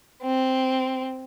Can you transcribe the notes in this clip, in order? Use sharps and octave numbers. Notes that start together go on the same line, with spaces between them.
C4